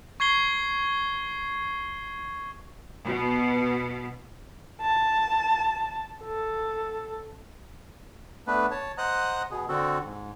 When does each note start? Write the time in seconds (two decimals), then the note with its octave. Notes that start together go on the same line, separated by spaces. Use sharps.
0.20 C#6 G#6 C7 G7
3.05 B2
4.81 A5
6.23 A4
8.47 A3 B3 D4 B4
8.71 C#5 A5
8.98 C5 D#5 F#5 A#5 D#6 F#6
9.51 B2 B3 G#4
9.68 D3 C4 F#4 A4
10.04 G#2